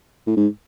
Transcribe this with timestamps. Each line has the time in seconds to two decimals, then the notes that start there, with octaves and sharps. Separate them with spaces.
0.27 A2
0.37 G#2